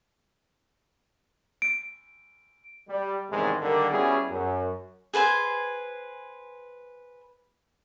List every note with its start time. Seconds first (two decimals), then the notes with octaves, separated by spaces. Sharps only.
1.62 D7
2.89 G3
3.31 A1 E2 G#2 C3 D#3 G#3
3.61 D3 D#3 G3 A#3
3.91 G3 B3 C#4 E4 F#4 G#4
4.30 F#2
5.14 G#4 B4 C5 G#5